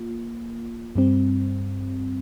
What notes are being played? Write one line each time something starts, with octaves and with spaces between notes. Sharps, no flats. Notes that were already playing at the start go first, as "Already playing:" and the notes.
Already playing: A#3 F4
G2 G3 C4